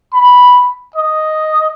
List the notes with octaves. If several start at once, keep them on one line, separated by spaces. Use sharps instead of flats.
B5
D#5